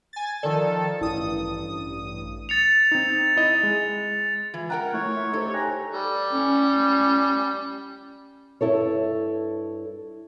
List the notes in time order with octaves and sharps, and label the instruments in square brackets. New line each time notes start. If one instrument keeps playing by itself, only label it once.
[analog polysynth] G#5 A6
[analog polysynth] D#3 F3 A4 [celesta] D5
[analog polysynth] A1 G2 D#6 [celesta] E4
[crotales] A6 C#7 F7
[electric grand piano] C4 D#4
E4 D#5
G#3
[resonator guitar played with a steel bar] E3 [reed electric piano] F4 G#6
[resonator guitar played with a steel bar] A#4 G5 A#5 [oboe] F#5
[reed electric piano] A3 E4 [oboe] C#5
[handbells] E5 C6
[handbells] D#4 G4 C5 [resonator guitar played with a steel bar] A4
[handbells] C#5 [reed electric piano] G5 G#5 F#6 [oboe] A#5
[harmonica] G3 [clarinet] A4
[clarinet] C#4
[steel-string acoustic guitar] G2 E4 A4 C#5